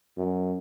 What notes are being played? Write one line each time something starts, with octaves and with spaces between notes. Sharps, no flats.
F#2